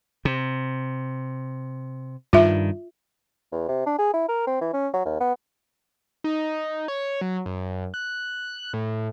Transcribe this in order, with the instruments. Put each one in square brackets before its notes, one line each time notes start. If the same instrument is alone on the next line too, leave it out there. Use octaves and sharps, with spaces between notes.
[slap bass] C3
[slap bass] G2 D#3 [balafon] F4 E5
[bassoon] E2
C3
D4
G#4
E4
A#4
C4
E3
C#4
F#3
D#2
B3
[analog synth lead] D#4
C#5
F#3
F#2
F#6
A2